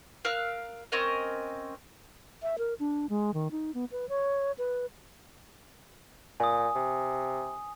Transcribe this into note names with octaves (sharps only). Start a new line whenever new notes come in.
A#4 F5 E6 F#6
C4 C#4 A#4 D#5
E5
A#4
D4
G#3
D#3
D#4
B3
B4
C#5
B4
A#2 G#5 D#6
C3